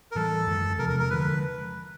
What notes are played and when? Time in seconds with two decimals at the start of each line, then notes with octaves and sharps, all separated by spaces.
0.11 A#4
0.15 A2 E3 G3 A4
0.47 F#2 D#3 G#3
0.79 E2 C3 F3 A#4
0.89 A#4
1.00 A#4
1.10 D3 F3 G#3 B4